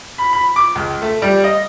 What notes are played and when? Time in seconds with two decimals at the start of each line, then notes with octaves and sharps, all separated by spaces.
0.18 B5
0.33 B5
0.56 D6
0.75 C#2
1.02 A3
1.22 G3
1.44 D#5